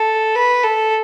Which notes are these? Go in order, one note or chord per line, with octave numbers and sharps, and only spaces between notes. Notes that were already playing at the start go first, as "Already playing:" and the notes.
Already playing: A4
B4
A4